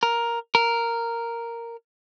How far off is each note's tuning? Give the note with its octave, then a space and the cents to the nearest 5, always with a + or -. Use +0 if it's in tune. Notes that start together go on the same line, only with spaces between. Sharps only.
A#4 +5
A#4 -5